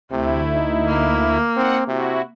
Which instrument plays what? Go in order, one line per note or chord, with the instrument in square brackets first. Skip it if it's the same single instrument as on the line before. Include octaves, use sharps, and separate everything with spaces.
[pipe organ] D2 E4 [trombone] C3 [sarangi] A3
[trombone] D#4
[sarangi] A#3
[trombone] C4 [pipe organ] D#4 F#5
[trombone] C3 [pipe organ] E4 F#4